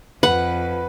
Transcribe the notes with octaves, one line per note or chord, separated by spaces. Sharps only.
F2 B4 F#5